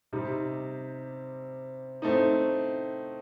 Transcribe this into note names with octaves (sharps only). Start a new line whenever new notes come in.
C3 G3 C4 D#4
A2 A3 C4 D#4